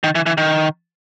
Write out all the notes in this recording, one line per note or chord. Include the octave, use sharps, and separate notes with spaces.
D#3
E3
E3
D#3